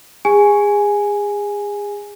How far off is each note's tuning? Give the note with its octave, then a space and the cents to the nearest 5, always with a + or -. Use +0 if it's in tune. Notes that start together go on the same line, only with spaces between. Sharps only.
G#4 -30 G#5 +0